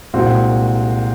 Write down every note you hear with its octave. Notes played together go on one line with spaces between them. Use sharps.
C2 A#2 G#3 C4 F#4